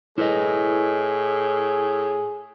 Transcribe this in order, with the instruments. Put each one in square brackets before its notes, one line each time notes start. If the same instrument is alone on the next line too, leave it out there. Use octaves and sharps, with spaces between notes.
[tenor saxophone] A2 [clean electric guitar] E4 B4 D#5 [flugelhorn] G#4